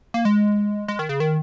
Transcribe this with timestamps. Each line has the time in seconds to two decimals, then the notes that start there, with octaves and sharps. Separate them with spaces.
0.14 A#3
0.25 G#3
0.88 G#3
0.99 D#3
1.09 C#3
1.20 D#3